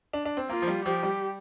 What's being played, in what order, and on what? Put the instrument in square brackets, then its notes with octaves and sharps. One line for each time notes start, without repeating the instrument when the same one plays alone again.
[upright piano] D4
D4
C4
[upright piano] A#3 [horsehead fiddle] F4
[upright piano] F3
G3
[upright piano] F3 [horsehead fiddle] G4
[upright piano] G3